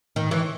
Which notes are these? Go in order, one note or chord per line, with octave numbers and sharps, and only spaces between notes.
D#3
E3